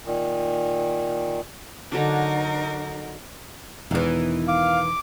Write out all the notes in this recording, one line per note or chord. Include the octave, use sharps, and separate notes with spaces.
A#2 D#3
D3 F#3 D4 D#4 A#4
E1 E2 D#3 E3
F5 D6